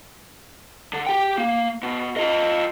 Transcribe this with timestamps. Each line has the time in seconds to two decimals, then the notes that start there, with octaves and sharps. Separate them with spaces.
0.93 D3
1.06 G4 G5
1.38 A#3
1.83 B2
2.17 F4 D#5